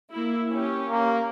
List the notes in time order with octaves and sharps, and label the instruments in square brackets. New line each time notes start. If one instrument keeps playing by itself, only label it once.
[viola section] A#3 E4
C#4 G4
[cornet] A#3